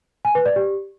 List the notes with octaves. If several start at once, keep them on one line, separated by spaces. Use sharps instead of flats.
G#5
B4
D5
G4